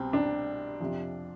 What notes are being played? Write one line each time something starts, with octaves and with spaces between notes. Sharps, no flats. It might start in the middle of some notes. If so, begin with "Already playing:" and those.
Already playing: C2 B2 C4
D4
F2 C3 F3